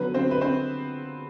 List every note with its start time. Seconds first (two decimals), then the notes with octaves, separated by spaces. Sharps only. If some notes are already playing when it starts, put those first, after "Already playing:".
Already playing: D3 F#3 B3 B4
0.14 C4 C5
0.31 B4
0.41 C4 C5